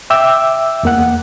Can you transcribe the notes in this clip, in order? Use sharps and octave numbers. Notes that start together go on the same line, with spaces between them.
E5 G5 D6 E6
E2 A#3 F#5